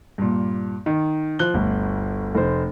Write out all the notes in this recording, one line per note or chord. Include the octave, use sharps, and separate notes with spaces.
G2 A#2
D#3
F3 F#6 G7
G1 D2
F1 C5